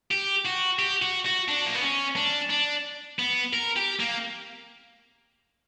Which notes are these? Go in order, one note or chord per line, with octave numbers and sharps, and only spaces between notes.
G4
F#4
G4
F#4
F#4
D4
A#3
B3
C#4
D4
D4
B3
A#4
G4
A#3